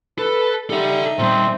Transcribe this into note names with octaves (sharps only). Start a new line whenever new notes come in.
A4 B4
G3 D#4 A4 E5 F#5
A#2 G3 C4